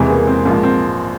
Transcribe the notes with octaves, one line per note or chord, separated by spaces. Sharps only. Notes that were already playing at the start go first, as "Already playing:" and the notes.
Already playing: E1 E2 C3 E3 G#3
A#3
C4
A#1 G#2 F3 A#3
C4